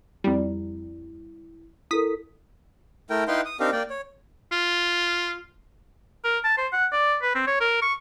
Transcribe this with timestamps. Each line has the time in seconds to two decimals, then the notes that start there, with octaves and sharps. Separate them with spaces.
0.24 F2 G3 E4
1.91 E4 A4 A#4 D#6 B6
3.10 A3 E4 A#4 G5
3.28 D#4 E4 B4 F5 G5 C6
3.45 D#6
3.60 C4 D4 D#4 G4 A#4 F5
3.72 A#3 D5 G5
3.90 C#5
4.52 F4
6.24 A#4
6.44 A5
6.58 C5
6.73 F#5
6.92 D5
7.22 B4
7.35 C4
7.47 C#5
7.61 A#4
7.82 C#6